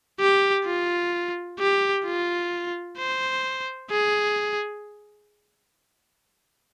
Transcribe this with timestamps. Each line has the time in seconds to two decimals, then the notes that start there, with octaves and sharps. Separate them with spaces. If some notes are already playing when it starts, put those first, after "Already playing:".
0.20 G4
0.65 F4
1.59 G4
2.05 F4
2.98 C5
3.91 G#4